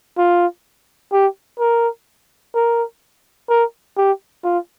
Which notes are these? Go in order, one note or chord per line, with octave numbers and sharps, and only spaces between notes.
F4
G4
A#4
A#4
A#4
G4
F4